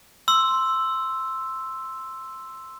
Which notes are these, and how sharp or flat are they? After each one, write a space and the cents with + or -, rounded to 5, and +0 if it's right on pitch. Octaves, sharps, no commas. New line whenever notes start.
C6 +0 E6 +0